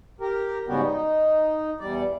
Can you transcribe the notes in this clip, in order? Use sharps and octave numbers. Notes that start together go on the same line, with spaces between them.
G4 A#4
G#2 C#3 G3 B3 F#4 G4
D#4
E2 G3 D5